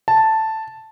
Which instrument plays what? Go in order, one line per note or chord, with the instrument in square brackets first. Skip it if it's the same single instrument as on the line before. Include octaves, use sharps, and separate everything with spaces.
[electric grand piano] A5